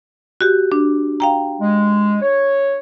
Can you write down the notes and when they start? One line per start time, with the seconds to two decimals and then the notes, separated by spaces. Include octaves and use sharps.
0.41 F#4 G4
0.72 D4
1.20 F5 G5 A#5
1.60 G#3
2.22 C#5